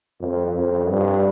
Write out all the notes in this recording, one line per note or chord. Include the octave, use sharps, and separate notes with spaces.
F2
F2
G2